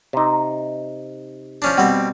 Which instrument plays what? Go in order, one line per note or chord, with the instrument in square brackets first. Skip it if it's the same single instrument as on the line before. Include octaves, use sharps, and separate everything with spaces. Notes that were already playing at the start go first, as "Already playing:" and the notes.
[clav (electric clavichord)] C3 D#4
[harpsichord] F3 C#4 D4
[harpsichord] B2 G3 C4 [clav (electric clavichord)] F#5